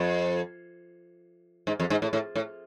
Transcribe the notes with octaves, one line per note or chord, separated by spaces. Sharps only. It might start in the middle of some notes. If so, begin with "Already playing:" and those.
Already playing: F2
G#2
F2
G#2
A2
A2
A2